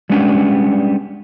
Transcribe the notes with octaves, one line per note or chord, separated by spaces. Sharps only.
G3 G#3 B3 C#4 D4